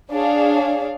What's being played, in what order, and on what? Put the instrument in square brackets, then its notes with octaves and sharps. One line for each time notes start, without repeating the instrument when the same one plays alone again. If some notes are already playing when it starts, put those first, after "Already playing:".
[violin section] D4 G#4 C#5 F5